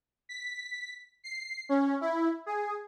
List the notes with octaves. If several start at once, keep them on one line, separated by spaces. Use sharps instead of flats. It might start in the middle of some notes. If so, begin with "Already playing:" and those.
B6
C7
C#4
E4
G#4